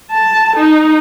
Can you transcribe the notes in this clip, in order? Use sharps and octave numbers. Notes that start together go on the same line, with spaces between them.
A5
D#4